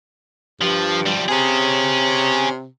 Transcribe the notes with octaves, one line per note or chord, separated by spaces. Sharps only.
G2 F3
F3 G3
C3 C#4 G#4